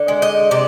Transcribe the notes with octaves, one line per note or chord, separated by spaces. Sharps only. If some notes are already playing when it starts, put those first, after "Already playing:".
Already playing: D3
G#3
D#5
C3 D5